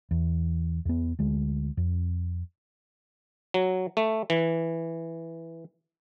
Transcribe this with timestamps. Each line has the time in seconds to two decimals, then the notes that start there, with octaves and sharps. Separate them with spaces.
0.11 E2
0.85 E2 B3
1.19 D2 G#3
1.77 F2
3.54 F#3
3.97 A3
4.30 E3